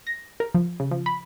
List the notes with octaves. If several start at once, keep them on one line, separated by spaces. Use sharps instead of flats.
A#6
A#4
F3
C#3
F3
B5